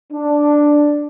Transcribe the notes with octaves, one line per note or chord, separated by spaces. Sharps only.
D4